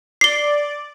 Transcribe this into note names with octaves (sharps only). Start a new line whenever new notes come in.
D5 C7 G7